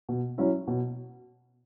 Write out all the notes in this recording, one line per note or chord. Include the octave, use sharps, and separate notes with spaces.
B2
F#3 C#4 E4
B2